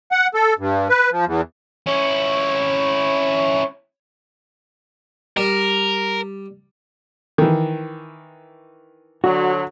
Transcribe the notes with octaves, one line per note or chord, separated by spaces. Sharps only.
F#5
A4
G2
B4
F3
E2
C#4 E4 C#5
G3 A#4
D#3 E3
D3 F#3 F#4